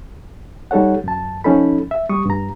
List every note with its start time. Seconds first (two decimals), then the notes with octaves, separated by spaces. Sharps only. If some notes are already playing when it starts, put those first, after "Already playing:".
0.71 G3 D#4 A4 C#5 F#5
1.04 F#2 A5
1.44 F3 C#4 D#4 A4 B5
1.91 E5
2.09 G3 C#6 D#6
2.26 G2 A#5